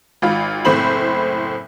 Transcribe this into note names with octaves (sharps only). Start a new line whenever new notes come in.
G#1 F4 B5
F#1 A2 C4 C5 B5 F#7